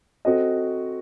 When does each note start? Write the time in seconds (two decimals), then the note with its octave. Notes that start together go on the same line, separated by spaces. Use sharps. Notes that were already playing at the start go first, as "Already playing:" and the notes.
0.25 C4 F#4 A4 D#5